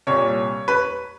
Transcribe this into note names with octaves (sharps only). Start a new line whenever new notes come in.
C2 A#2 C#5
B4